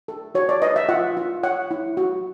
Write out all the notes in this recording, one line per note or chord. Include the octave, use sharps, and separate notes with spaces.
A4
F#4 C#5
D5
B4 D#5
E5
F4 F#5
F4
C#5 F#5
E4
F#4